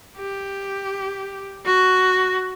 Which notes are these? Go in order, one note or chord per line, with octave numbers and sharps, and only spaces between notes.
G4
F#4